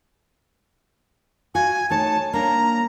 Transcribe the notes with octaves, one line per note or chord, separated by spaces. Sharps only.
F#4 F5 G#5
A3 D#4 C#5 A5
A#3 D4 A#5